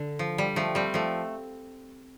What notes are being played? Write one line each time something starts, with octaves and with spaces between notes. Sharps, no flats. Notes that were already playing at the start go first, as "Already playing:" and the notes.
Already playing: D3
F3
G3
F3 A3
G3 C4
F3 A3